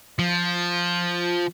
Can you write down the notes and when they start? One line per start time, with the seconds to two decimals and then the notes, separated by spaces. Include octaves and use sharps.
0.19 F3